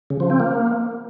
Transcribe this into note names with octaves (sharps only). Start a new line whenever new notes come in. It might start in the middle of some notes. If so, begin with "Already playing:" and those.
C#3
F3
C4
A#3